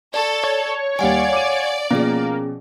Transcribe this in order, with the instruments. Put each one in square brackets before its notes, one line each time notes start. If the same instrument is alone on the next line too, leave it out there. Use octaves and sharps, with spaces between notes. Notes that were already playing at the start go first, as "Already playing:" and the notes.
[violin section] A4 [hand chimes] D5 C#6
[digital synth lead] C#5
[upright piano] D#2 G3 [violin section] D5 [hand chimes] F5 F#5 G#5
[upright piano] D6 D#7
[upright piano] B2 F3 [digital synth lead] A#3 [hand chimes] C#4 G#4